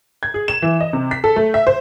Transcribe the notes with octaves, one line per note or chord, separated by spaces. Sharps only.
G#6
G#4
E7
E3
D#5
C3
B6
A4
A3
E5
C5